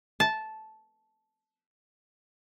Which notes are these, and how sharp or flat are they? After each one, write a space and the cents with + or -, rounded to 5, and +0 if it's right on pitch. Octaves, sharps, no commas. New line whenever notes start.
A5 -10